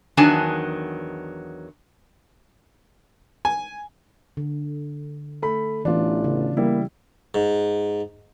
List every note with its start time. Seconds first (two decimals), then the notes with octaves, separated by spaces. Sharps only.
0.17 E2 D#3 F#3 D4 G#5 A5
3.45 G#5
4.37 D3
5.42 A3 B5
5.85 A1 E3 A3 B3 D4 F4
6.24 C#3
6.57 G3 A#3 E4
7.34 G#2